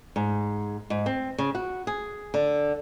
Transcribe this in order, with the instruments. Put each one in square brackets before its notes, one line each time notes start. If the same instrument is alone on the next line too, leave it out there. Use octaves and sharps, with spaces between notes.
[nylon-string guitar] G#2
G#2
C4
C#3
F#4
G#4
D3